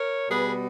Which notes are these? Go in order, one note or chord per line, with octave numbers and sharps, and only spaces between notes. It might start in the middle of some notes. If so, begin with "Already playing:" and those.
Already playing: A#4 C#5
B2 G3 B3 G#4 B4